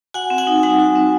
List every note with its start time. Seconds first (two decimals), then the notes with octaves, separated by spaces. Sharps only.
0.14 F#4 F#5 G#5
0.30 C4
0.38 F#5 G#5
0.47 D#4
0.63 G3 F#5 G#5
0.79 F#4
0.95 C4